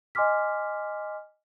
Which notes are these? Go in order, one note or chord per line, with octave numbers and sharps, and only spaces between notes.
D#5 G#5 C6 D6 F6 B6